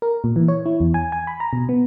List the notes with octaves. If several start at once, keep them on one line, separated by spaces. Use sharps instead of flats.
A#4
A#2
E3
C#5
E4
E2
G#5
G#5
B5
A#5
B2
B3